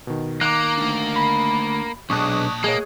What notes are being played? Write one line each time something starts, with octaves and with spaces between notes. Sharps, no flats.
B2 D#3
D#3 A#3 A#5 D6 F#6
A3 D4
B5
B1 A#2 G#3 D4 A5 C#6 D#6 F#6
G#3 A#3 G#4 C#5 D#5